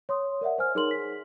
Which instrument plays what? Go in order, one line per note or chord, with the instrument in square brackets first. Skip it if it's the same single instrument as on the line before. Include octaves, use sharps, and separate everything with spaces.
[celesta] C#5 C6 D#6
A#4 D5 E5 F#5
C5 G#5 F6
D#4 G#4 A#4 C#5 C6 F#7
G#4 B6